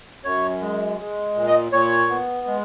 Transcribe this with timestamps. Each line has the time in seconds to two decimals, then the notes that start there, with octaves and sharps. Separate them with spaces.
0.24 F#2 C#5
0.61 G#3
0.98 G#3
1.35 A#2
1.47 D#5
1.72 A#2 C#5
2.10 B3
2.47 G#3